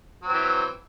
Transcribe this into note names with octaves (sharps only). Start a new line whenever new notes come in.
E3 F#3 C4